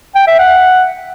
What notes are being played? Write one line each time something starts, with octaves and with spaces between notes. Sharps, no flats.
G5
E5
F#5